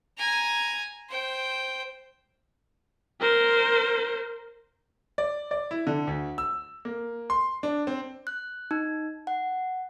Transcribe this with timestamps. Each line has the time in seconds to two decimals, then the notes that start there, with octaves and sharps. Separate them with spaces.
0.18 G#5 A#5
1.09 C5 G5
3.20 A#4 C5
5.18 D5
5.51 D5
5.71 E4
5.87 D3
6.07 D2
6.38 E6
6.85 A#3
7.30 C6
7.63 D4
7.87 C4
8.27 F#6
8.71 D#4
9.27 F#5